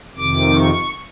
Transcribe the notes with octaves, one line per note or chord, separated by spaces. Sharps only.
F2 C3 D#3 D6
C#6